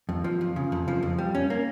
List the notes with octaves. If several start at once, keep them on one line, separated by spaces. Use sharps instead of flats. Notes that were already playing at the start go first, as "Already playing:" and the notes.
F2
F3
F2
C#3
F2
F3
F2
G3
C#4
A#3